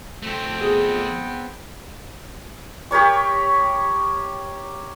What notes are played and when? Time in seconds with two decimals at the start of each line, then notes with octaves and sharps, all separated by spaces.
0.22 F2 A3 C4 G5
0.61 B3 G#4
2.91 G4 A#4 C#5 C#6